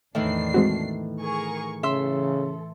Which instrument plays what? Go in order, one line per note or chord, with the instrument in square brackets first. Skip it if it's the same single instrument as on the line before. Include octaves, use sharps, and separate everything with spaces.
[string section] E2 D4 C7 [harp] A2 D#3 E3
[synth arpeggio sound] G#3 C4 F#4
[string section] G#4 A#4 C#6
[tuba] C#3 [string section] E3 A4 [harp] E5 C6 E6